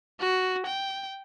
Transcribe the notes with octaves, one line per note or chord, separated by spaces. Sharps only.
F#4
G5